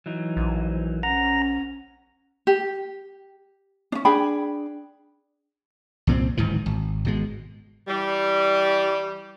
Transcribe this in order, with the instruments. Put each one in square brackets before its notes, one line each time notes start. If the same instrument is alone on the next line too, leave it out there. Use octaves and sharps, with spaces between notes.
[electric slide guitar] E3 F#3 D#4
[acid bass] A#1
[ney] C#4 [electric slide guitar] F#5 [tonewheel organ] A#5
[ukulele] G4
C#4 D4
D4 G#4 G5 B5
[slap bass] C2 A#2 F#3 C4
D1 G#2 D#3 E3
G#1
G#1 B2 G#3
[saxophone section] E3 G3